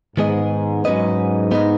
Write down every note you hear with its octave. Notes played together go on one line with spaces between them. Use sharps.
G#2 D#3 G#3 B3 G#4 D#5
G#2 F#3 C#4 B4 D#5
B3 D#4 B4 D#5